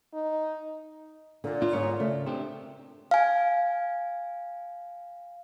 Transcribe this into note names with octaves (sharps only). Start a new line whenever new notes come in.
D#4
A#2 D3
D4 F4
G#2 B3 C#5
C#3 A3
C4 D4 G4 C5
F5 G#5